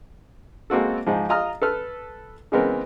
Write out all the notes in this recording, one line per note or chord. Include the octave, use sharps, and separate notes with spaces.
G#3 A#3 C4 F#4 A4
G#2 F3
F4 D#5 A#5 D#6 F6
A4 B4 F6
C#3 E3 G#3 B3 C4 A#4